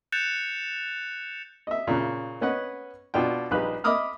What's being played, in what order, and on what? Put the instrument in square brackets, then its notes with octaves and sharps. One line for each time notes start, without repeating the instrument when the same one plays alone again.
[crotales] F#6 G6 A6 C#7 E7 F7
[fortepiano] D#5 E5
A#2 C#3
B3 C#4 B4 D#5 F#5
B2 D4 F4 G5
A#1 G3 D#4 B4 F#6
D#5 E5 B5 D6 D#6 F6